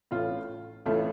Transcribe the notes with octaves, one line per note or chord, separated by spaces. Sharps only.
A1 A2 A3 C#4 F4
A1 A2 A3 C#4 F4